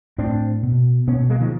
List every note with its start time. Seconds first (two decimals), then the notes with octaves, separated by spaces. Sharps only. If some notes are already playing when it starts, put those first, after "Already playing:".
0.18 A2 C4 D4
0.63 B2
1.07 B2 B3 C#4
1.30 G#3 A#3
1.41 D#3 F3